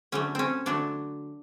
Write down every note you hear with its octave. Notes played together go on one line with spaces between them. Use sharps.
D3 F#3 A3 C#4
C4 C#4
D3 F#3 A3 D4